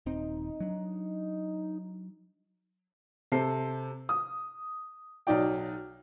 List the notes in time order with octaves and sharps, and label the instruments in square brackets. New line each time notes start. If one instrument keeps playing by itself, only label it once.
[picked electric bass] D#1 C4 [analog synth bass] D#4
[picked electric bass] F#3 D4
[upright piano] C3 A4 C5 C7
D#6
B1 F#3 D#4 D5 G5